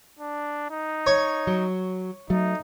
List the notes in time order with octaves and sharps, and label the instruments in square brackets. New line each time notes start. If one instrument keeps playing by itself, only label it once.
[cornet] D4
D#4
[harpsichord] C#5
[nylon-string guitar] F#3
[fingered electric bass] F#3 [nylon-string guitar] A3 [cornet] D#4